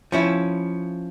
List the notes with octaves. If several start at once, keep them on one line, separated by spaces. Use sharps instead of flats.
F3 C#4 E4